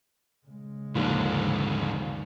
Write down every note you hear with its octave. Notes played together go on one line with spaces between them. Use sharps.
C#3 G#3
A#1 D#2 G#2 D3